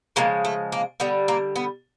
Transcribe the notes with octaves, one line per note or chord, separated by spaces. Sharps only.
C#3 F3 G#3 A#3
A3
A#3
D3 G3 B3
A#3
B3